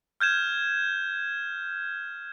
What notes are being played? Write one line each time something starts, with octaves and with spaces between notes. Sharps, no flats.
F6 G6 G#6 E7